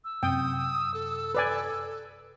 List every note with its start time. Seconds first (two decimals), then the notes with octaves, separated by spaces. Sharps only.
0.05 E6
0.23 F#2 C3 G5 D#6
0.94 A4
1.35 B4 D5 G#5